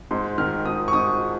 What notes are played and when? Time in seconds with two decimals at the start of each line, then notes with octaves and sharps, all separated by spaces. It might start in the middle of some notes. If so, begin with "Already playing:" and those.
0.11 G#2 C6
0.38 D#3 F6
0.66 G#2 D#6
0.88 C#6
0.93 G#2 D#6